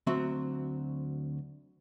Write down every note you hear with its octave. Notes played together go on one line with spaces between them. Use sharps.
D2 F#3 C4 E5